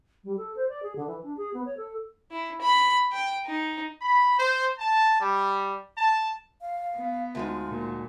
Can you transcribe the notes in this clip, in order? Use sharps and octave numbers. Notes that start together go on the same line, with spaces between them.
G3
A4
C5
D5
G#4
D3
E3
D4
G#4
B3
C#5
A4
E4
B5
G5
D#4
B5
C5
A5
G3
A5
F5
B3
D2 G#3 D#4 F4
A#2